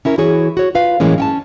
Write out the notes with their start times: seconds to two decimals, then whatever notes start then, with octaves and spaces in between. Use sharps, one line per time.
0.05 C#4 E4 A#4
0.18 E3 E4 F#4 G#4 C#5
0.57 F#4 C#5
0.75 F4 B4 F5
1.00 F#2 A2 E3 G#3 A#3 C#4
1.18 C#4 G5 A5